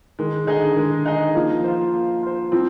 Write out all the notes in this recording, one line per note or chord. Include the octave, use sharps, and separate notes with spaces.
D#3 G#3
D3 D#4 G#4 D#5
D#3 G#3
D#4 G#4 D#5
F3 A#3
F4 C5
A#3
F4 C5
F3 C4